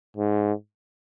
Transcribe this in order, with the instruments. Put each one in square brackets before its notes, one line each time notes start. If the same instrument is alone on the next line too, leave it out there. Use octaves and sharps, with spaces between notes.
[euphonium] G#2